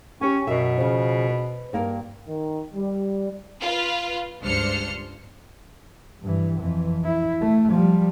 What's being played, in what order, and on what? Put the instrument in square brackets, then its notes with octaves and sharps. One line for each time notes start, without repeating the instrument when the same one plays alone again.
[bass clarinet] C#4 [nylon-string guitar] G4 C#5 G#5
[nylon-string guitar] F#2 A#4 E5 [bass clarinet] B2
[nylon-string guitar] C#3 F3
B4
G2 A#3 A#4
[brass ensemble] D#3
G3
[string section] F4 B4
C#2 G2 D4 C5 F6 C#7
[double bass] G2 E3
F2 E3
E4
A3
F3 G3